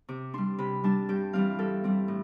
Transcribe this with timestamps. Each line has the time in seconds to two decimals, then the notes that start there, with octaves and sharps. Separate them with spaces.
0.08 C3 D6
0.34 G3 D4 C6
0.59 C3 B5
0.84 G3 D4 A5
1.09 G2 G5
1.33 E3 G3 C4 F5
1.59 G2 A4
1.84 E3 G3 C4
2.08 A2